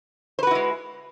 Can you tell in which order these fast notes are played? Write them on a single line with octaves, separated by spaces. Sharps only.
C5 B4 F#4 E4 G#3